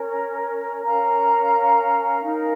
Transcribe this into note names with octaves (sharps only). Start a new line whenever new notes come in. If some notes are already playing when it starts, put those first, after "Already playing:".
Already playing: C#4 A#4 C#5
C#4 A#4 F5 A#5
D#4 A#4 F5